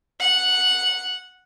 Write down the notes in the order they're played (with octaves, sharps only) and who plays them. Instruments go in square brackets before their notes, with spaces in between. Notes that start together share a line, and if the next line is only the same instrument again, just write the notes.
[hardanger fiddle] F#5